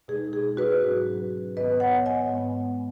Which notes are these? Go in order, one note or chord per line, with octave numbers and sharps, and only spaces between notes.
B2 G#3 D#4 G#4
G#4
F#4 B4
G#2 F#3 C#4
G#2 D#3 B3 B4 D#5
C#5 F#5
D#5 G#5
G#2 G#3 B3